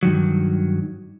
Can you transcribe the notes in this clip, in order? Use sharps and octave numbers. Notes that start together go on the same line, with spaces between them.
G2 D#3 F#3